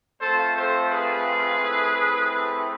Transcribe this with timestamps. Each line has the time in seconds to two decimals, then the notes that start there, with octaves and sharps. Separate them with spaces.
0.21 A3 C4 F4 A4 C5
0.56 A4 C5
0.90 G#4 B4
1.59 A3 C4 E4
2.28 G#4 B4